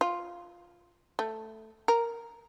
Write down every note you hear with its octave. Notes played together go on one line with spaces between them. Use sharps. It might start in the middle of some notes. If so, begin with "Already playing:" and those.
F4
A3
A#4